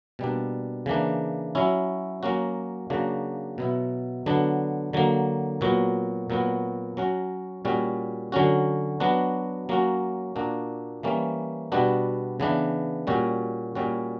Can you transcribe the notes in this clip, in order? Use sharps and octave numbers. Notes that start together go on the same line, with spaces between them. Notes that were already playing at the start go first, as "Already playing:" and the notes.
B2 G3 A#3 D4
C#3 E3 A#3 D4
F#3 C#4 E4
F#3 A#3 C#4 F#4
C#3 F#3 A#3 D4 F#4
B2 F#3 B3 E4
D3 F#3 B3 D4
D3 F#3 A#3
A#2 F#3 B3 F#4
A#2 F#3 B3 F#4
F#3 C#4 F#4
A#2 G3 C#4 F#4
D3 F#3 C#4 F#4
F#3 B3 D4 F#4
F#3 A#3 C#4 F#4
A#2 A#3 D4 F#4
E3 G3 A#3 C#4
B2 G3 B3 D4 F#4
C#3 E3 B3 D4
A#2 G3 C#4 F#4
A#2 G3 C#4 F#4